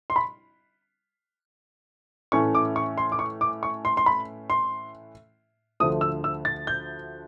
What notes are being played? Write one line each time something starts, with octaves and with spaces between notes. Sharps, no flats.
C6
B5
A2 E3 A3 C#4 C#6
D6
C#6
C6
D6
C#6
D6
C#6
C6
C6
B5
C6
D2 D3 F3 A3 D#6
E6
E6
A6
G6